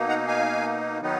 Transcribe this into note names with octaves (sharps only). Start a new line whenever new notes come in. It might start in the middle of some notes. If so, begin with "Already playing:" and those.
Already playing: B2 A#3 D#4
F#5 A#5
F5 G#5
D#3 F#3 B3 D#4